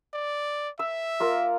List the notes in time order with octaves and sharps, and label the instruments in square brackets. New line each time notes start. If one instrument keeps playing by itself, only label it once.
[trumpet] D5
[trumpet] E5 [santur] E6
[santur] A#3 F4 A#4